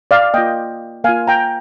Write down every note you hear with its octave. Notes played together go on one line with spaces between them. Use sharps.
D5 F5
A#3 F4 D#5 G5
A#3 F4 F5 G#5
G5 A#5